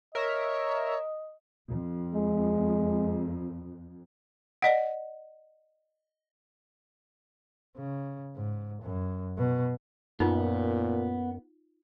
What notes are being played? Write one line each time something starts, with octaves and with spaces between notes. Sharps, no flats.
A#4 C#5 D#5 E5
F2
G#3
D5 D#5 F#5
C#3
G#2
F#2
B2
F#2 A#2 B3 D#4 F4